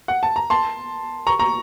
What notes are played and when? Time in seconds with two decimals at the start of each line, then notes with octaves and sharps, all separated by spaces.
0.08 F#5
0.23 A5
0.36 A#5
0.50 A5 C6
1.27 A#5 C#6
1.39 A#5 C#6